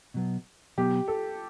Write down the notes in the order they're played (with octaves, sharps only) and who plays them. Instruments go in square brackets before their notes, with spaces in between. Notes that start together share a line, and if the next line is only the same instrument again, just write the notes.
[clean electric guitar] B2 F#3 B3
[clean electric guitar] B2 F#3 B3 [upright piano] G4
[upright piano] A4